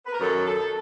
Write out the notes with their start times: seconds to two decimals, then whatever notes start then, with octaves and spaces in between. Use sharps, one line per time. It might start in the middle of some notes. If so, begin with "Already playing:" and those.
0.06 B4
0.13 A#4
0.20 F#2 D#3 F#3 A4
0.47 A4